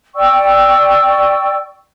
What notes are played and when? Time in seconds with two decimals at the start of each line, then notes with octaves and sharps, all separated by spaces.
0.15 D5 G5 C#6 E6